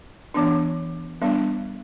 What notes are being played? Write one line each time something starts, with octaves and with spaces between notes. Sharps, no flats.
E3 B3 D4
G3 B3 D4